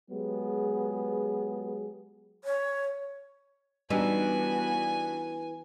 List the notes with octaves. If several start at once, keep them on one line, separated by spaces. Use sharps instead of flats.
F#3 G#3 B3 G4 G#4
C#5
E3 G3 B3 D4 D#4 F#4 G#5